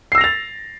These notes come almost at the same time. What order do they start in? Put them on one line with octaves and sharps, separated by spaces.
C7 E6 A#6 F7 A6